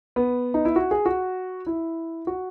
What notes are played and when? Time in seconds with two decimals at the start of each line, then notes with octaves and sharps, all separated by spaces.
0.16 B3
0.54 D#4
0.65 E4
0.76 F#4
0.91 G#4
1.06 F#4
1.67 E4
2.27 F#4